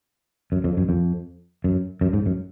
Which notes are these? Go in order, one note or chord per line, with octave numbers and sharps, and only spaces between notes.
F#2
F2
F#2
F2
F#2
F#2
G#2
F#2